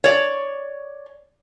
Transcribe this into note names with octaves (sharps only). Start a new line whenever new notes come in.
C#5 D5